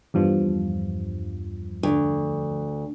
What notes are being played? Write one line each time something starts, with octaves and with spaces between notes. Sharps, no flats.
E2 G2 F3
D2